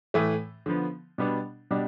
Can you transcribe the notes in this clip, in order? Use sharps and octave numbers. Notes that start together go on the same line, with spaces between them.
A2 E3 A3
D3 F3 B3
B2 G3 B3 D4
B2 G3 D4